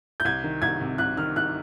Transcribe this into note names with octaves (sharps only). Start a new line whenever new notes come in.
G6
C2 G#6
D#3
C2 G#6
C3
C2 F#6
D#3 F6
C2 F#6